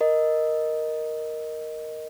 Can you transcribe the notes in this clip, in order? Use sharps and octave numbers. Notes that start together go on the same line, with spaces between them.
A#4 D#5